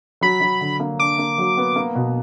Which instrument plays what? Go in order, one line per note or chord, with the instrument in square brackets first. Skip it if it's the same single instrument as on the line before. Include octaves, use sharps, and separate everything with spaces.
[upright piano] F#3 [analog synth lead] B5
[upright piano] F#3
D3
A#3
[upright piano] D4 [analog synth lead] D6
[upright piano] A#3
F#3
B3
A#3
B2